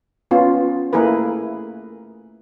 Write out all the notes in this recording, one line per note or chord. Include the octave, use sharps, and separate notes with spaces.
B3 C#4 F4
A3 A#3 E4 G#4 A#4 B4